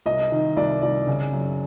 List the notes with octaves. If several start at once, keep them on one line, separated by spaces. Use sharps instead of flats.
C2 D#5
D#3
C2 D5
C2 D5
C#3
F#2